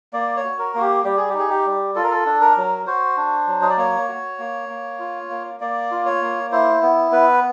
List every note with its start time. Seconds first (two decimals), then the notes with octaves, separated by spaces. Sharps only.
0.13 A#3 D5
0.36 C#5
0.44 F#4
0.59 A#4
0.75 A#3 F#4
0.81 G4
1.04 G3 G4
1.17 G#4
1.29 G4
1.34 D#4 G#4
1.50 G4
1.66 G3
1.95 F4 A4
2.03 A#4
2.11 A4
2.26 D4
2.41 A#4
2.57 F#3
2.87 F#4 C5
3.17 D4
3.47 F#3
3.62 D#5
3.70 D5
3.77 A#3 C#5
4.08 F#4
4.39 A#3
4.69 A#3
4.99 F4
5.30 A#3
5.60 A#3 D5
5.91 F4
6.05 C#5
6.21 A#3
6.52 E4 C5
6.82 B3
7.12 B3 B4